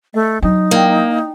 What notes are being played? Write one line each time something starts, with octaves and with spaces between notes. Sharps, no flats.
A3 D#5
F#3 D4 D#4
A#3 E4 D5 G5